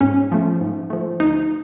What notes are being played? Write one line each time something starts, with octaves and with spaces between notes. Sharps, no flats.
G#2 C#4
F3 A3
G#2
F3 A3
D2 D#4